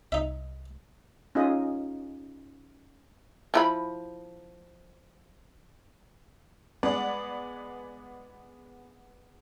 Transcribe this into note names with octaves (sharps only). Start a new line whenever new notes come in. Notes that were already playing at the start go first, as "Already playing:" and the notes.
C2 D#4 E5
C#4 D#4 F4 G#4 D#5
F3 E4 B5
G#3 B3 D5 F#5